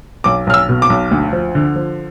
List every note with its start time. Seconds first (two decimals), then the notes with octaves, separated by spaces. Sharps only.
0.24 B1 D6
0.47 B1 F6
0.54 E6
0.69 B2
0.82 D6
0.90 B1
1.11 D2
1.33 F3
1.55 D3
1.76 F3